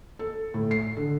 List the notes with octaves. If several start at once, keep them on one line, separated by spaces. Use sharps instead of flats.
A4
A2
C7
D3